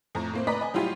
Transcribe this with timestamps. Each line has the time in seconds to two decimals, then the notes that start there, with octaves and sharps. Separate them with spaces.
0.15 F2 A2 A#5
0.33 A2 A#3 C4
0.47 B4 D5 D#5 A#5 D6 B6
0.61 D#5 G#5
0.74 A2 F#3 G3 E4 F4 G4